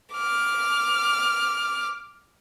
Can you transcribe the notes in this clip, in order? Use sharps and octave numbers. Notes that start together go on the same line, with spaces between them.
D6 F6